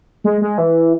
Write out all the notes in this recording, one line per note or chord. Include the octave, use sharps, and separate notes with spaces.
G#3
G#3
E3